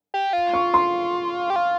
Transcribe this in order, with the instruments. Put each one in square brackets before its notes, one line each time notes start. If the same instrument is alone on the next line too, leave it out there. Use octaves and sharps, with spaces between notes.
[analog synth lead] G4
F4
[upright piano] C#6
C6
[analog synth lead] G4
F4